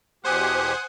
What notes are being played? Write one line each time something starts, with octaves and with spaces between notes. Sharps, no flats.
E2 B2 G4 C5 F#5 G#5 D#6